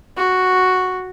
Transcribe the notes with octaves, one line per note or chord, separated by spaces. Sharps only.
F#4